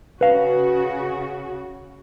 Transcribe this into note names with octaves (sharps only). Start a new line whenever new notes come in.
C#3 F#4 B4 F5